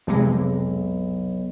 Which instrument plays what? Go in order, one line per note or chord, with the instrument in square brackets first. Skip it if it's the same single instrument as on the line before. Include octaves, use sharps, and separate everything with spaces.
[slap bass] B1 [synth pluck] F2 C3 G#3